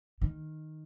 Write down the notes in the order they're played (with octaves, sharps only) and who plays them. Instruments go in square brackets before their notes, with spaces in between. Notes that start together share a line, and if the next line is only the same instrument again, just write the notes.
[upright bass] D#3